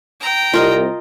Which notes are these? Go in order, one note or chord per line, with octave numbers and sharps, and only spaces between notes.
G5 A#5
C2 F4 A#4 D#5